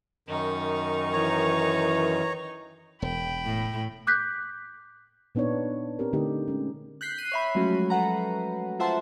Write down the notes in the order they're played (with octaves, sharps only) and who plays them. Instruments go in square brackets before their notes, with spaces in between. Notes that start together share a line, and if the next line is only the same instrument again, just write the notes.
[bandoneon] F#2 D#3 [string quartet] D#4 C#6
[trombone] E3 [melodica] C#5 A#5
[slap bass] E1 [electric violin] G5 B5
[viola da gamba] A2
[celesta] D6 F#6 G6 B6
[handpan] A#2 B3 D4 D#4 C#5
C4 G4 A#4
D3 A3 D#4 G4 D#5
G#3 C#4
[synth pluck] F#6 G6 B6 C7
F#6 C7 D#7
C#5 E5 B5
F3 F#3 G#3 A3 C#4 F#4
A4 B4 F#5 A#5
F4 C5 E5 F#5 A5 C6